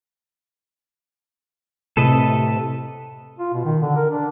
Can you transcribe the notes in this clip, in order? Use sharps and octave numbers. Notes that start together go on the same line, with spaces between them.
A2 C3 A4 B4 D#5
F4
B2
D#3
D3
A#4
D4